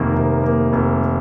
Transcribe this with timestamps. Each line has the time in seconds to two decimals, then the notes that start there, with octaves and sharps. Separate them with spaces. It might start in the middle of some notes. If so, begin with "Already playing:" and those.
Already playing: F1 D#3 A#3
0.13 F1
0.44 A#3
0.73 F1